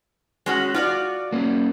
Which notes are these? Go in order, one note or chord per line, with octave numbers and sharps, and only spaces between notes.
G#3 C#4 F#4
F4 F#4 D5
A#3 C#4